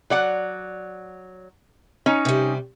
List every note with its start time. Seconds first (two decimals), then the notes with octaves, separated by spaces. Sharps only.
0.10 F#3 D5 F#5
2.06 C#4 D#4 C#5
2.25 C3 G3